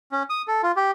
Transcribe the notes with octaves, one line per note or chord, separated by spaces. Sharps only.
C#4
D#6
A4
F4
G4